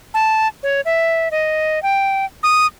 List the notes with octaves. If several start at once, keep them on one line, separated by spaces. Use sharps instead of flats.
A5
C#5
E5
D#5
G5
D#6